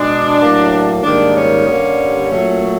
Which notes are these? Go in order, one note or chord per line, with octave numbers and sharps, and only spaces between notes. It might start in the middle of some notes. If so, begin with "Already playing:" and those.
Already playing: B2 G#3 D4
A2 F#3 A#3
G#2 D#3 G3 A#3 D4
C#4
G2 D3 G3 A#3
A#2 F#3 A3